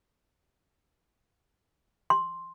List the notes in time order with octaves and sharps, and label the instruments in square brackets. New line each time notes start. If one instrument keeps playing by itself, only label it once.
[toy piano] C6